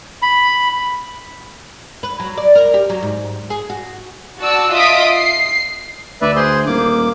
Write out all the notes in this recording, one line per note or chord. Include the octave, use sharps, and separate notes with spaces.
B5
B4
F#3
D5
A#4
G4
F#3
G#2
G#4
F#4
F#4 D5 A5 E6
F4 D#5 E5 D#6 B6 D7
C7
D2 B4 D5 E5
G#4 C5 C6
D#1 A#3 D6